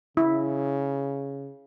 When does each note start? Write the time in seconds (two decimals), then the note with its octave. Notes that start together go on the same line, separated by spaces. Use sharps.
0.17 C#3 E4